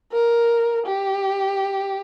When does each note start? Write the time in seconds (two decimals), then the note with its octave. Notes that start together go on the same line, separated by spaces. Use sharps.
0.12 A#4
0.85 G4